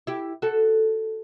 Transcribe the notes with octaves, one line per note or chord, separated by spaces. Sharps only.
E4 G4
F#4 A4